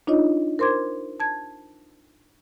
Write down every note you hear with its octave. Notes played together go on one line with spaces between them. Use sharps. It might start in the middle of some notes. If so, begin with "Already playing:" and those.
D4 D#4 F4 C#5 D#5
A#4 C5 C6 D6 G#6
A5 G#6